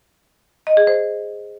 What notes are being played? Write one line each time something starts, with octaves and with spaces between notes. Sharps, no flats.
D#5
G#4
C5